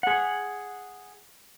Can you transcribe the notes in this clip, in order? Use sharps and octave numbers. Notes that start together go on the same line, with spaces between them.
G#4 F#5